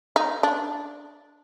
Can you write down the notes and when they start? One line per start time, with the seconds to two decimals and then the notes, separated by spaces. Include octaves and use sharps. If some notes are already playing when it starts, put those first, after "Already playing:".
0.16 D#4
0.43 D4